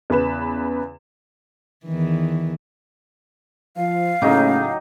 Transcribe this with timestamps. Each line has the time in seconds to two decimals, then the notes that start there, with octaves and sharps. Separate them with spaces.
0.10 E2 C#3 B4 E7
1.86 E2 D#3 E3
3.77 F3 F5
4.22 A2 C#3 F#3 A3 A#3 C#4 D#4 G4